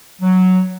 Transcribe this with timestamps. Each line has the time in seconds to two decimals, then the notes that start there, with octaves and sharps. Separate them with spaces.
0.22 F#3